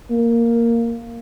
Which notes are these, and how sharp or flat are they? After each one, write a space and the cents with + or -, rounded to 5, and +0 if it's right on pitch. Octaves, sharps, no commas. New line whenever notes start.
A#3 -5